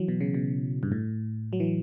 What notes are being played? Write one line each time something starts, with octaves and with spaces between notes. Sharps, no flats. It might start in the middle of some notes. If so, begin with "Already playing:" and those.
Already playing: E3 F#3
B2
C#3
B2
G2
A2
F#3
E3